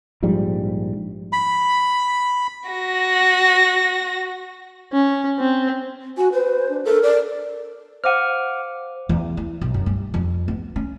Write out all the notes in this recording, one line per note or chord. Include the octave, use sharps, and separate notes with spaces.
A#1 G#2 F3 G3
B5
F#4 A#6
C#4
C4
F#4 G#5
B4 C5
D4
A4 A#4
D5
C5 F5 F#5 D6 F6 D#7
E2
E4
B1
F#2
G2
F2
B3
C#4